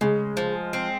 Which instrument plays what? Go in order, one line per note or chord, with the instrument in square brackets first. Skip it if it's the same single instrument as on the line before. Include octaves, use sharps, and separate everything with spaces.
[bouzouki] C#3 [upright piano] G#3
[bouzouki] F3
C4